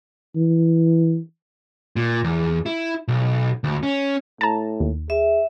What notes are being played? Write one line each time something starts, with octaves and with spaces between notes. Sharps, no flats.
E3
A#2
E2
E4
B1
D2
C#4
A2 A5 A#5
D#2
G#4 E5